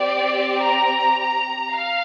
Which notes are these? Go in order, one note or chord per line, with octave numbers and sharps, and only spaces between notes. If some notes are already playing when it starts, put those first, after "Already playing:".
Already playing: C4 G4 D5
A#5
A#5
F5